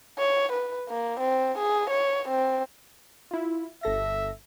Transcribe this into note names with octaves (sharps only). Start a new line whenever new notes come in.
C#5
B4
A#3
C4
G#4
C#5
C4
E4 F4
G1 A4 E5 A#6